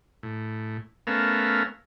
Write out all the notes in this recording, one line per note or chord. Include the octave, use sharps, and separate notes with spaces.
A2
A3 B3 C#4 A#4 F5 E6